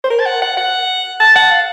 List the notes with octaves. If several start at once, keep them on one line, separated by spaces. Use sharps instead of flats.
C5
A#4
A5
F#5
F#5
F#5
A5
F#5
F5